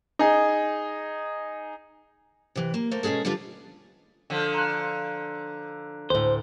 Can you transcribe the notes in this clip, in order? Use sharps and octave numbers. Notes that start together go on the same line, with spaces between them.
D#4 G#4
C3 E3
A#3
A3 A#3 C5
B2 G#3 C#4 G#4 A4
D3 G3 F4 B4
D3 F3
A#5 F#6
D2 A2 C5